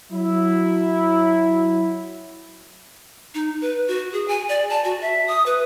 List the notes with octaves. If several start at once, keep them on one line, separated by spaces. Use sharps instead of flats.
F#3 E4
D#4
B4
F#4
G#4
G#5
D5
A5
F#4
E5
D#6
B4